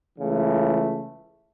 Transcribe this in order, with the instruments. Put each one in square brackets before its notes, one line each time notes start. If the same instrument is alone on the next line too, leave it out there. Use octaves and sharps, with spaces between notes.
[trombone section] C#2 C#3 E3 A3